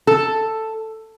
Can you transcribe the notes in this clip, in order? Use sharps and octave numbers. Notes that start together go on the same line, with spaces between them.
A4